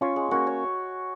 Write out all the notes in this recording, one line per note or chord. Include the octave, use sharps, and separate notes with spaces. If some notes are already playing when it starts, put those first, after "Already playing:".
C#4 F4 C#5
G#3
A#3 C#4 F#4
C#5